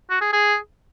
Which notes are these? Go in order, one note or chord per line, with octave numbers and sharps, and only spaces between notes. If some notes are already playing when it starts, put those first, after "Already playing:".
F#4
G#4
G#4